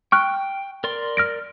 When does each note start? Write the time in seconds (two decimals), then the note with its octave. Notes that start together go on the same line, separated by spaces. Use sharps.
0.12 G5 C#6 F6 F#6
0.84 A#4 D5 C6
1.17 F6 A#6 D7